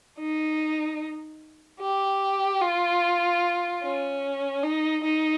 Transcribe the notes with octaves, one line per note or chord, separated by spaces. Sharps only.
D#4
G4
F4
C#4
D#4
D#4